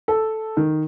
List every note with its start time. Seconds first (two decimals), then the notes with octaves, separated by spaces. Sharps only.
0.08 A4
0.57 D#3